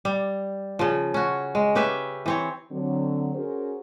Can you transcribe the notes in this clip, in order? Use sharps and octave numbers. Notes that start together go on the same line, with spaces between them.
G3
C#3 F3
C#4 F#4
G#3
C#4 G4 B4 E5
E3 C4 C#5
D3 F#3 C4
C#4 F#4 G#4 A#4 C5